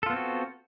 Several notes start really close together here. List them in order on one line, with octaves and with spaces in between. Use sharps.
A4 F4 B3 C4 F#4